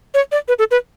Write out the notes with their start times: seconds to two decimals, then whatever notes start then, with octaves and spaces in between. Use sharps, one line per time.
0.14 C#5
0.32 D5
0.48 B4
0.59 A4
0.71 B4